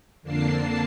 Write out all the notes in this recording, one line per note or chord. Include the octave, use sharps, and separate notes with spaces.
F2 D3 A#3 D4 A5 C7